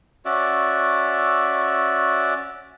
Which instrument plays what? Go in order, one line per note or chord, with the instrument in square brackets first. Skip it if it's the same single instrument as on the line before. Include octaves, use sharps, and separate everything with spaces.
[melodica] C#4 F#4 D5 E5